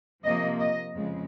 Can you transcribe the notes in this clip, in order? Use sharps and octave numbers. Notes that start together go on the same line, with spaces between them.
C3 F3 A#3 D#5
D#5
F2 C#3 G#3